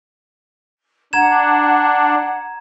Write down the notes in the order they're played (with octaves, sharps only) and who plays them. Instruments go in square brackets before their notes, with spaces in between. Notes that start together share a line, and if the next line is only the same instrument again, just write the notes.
[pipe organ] D4 [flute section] F#5 [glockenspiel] A#5 G#6 E7